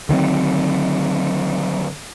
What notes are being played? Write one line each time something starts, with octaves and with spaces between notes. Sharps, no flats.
D3 D#3 F#3 C4